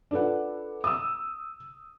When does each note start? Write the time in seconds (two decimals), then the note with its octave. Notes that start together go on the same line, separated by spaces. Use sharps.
0.11 D4 F4 A4 B4 F#5
0.84 D#6 E6